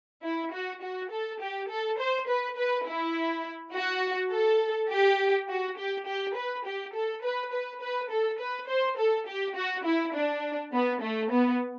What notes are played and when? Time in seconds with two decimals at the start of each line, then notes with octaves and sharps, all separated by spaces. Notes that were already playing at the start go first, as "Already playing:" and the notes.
0.24 E4
0.53 F#4
0.82 F#4
1.11 A4
1.40 G4
1.69 A4
1.99 C5
2.28 B4
2.57 B4
2.86 E4
3.73 F#4
4.32 A4
4.90 G4
5.49 F#4
5.77 G4
6.07 G4
6.36 B4
6.65 G4
6.94 A4
7.23 B4
7.52 B4
7.81 B4
8.10 A4
8.40 B4
8.68 C5
8.97 A4
9.27 G4
9.56 F#4
9.85 E4
10.15 D4
10.73 B3
11.01 A3
11.30 B3